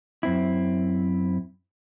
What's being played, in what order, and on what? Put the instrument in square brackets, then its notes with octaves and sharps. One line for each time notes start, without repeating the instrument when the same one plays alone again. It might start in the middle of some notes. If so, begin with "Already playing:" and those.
[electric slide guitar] F#2 C4 E4